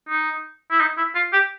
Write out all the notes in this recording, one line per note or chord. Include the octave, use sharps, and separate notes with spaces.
D#4
E4
D#4
E4
F4
G4